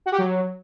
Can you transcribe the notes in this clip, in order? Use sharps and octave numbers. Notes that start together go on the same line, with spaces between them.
F#4
G4
F#3